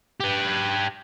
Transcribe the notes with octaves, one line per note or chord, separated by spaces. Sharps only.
G4 B4